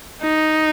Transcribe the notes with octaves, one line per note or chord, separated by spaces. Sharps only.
D#4